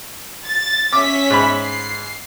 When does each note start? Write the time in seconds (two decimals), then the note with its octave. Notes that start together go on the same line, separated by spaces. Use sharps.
0.45 A6
0.93 C#4 E5 D6 B6
1.30 G#2 B5
1.62 C7